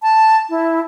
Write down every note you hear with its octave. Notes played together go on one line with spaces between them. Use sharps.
A5
E4